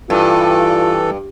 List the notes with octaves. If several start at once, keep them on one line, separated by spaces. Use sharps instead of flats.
G2 E3 F4 A4